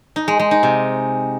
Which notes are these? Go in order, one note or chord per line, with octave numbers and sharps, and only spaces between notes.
D#4
G#3
G#3
D#4
C3